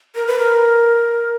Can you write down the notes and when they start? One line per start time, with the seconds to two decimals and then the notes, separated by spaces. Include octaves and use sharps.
0.15 A#4
0.27 B4
0.39 A#4